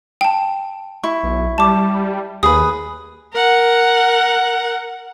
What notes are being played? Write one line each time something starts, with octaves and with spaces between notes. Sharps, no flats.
G5 A5
E4 C#6
B1
G3 A5 D6
D#2 G#4 B4 D#6
A#4 F#5